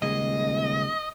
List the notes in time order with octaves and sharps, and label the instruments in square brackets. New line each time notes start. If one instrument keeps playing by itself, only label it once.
[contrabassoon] D#1 [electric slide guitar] C#3 G#3 G#4 [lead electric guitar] D#5